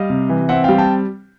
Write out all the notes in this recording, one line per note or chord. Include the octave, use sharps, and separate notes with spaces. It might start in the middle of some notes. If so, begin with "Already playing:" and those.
Already playing: G3 D#5 F5
C3
E3
C4 E5 F#5
G3 F5 G5
G5 A5